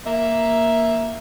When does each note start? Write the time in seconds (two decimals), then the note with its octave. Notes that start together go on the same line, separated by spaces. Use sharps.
0.06 A#3 E5